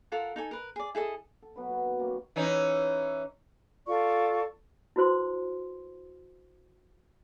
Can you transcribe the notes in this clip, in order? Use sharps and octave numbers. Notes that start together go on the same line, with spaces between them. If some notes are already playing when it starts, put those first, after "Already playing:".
F4 A4 A#4 F#5
D#4 A4 G#5
A#4 B4
G#4 D5
E4 G#4 A4 D#5
A4
B2 F#3 B4 B5
B2 B4 B5
D#3
F#2 G3 A#3 C#5
E3 C#4 D#4
F4 A4 D5 C#6
E4 F#4 B4 C5 C6